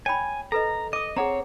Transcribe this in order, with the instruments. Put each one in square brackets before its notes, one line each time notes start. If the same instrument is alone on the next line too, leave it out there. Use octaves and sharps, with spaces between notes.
[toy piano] C#5 G5 B5 [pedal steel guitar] G#5
[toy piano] A4 B4 D#5 [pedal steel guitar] A#5
[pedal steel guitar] D#5 [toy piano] D6 D#6
[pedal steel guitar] C4 C#5 [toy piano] G#4 F#5 A#5